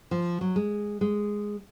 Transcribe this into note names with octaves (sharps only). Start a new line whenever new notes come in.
F3
F#3
G#3
G#3